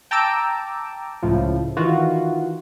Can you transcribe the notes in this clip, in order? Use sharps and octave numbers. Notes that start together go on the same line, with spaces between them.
G5 A5 A#5 D6 E6 D7
C#2 A2 F3
D#3 E3 F4 F#4